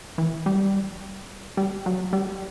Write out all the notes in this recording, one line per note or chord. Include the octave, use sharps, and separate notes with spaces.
E3
G3
G3
F#3
G3